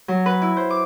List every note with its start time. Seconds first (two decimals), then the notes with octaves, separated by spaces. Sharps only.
0.08 F#3
0.26 B4
0.42 E4
0.57 C5
0.70 D6